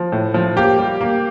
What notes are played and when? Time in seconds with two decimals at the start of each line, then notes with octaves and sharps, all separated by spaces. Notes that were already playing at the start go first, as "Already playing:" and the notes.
Already playing: F3
0.12 A2
0.34 F3
0.57 A#3 G4
0.79 G3
1.01 A#3